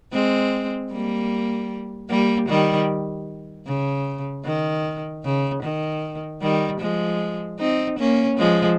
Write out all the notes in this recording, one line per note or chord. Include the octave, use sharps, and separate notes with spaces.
G#3 C4
G3 A#3
G3 A#3
D#3 G3
C#3
D#3
C#3
D#3
D#3 G3
F3 G#3
C4 D#4
A#3 C#4
F3 G#3